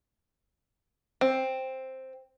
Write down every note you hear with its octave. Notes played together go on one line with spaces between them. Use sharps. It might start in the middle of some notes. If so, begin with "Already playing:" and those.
C4